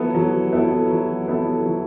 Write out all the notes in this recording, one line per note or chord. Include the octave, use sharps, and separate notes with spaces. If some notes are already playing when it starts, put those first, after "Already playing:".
Already playing: F#3 B3 E4 A4
F#3
B3 E4 A4
F#3
B3 E4 A4
F#3